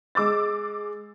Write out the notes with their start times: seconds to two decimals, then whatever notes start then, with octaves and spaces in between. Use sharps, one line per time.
0.15 G#3 D6 E6 A6